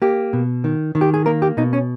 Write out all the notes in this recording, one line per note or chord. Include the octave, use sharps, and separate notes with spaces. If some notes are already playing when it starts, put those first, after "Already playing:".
A#3 G4
B2
D#3
D#3
G4
G#4
A#3 A#4
G4
B2 D#4
C#4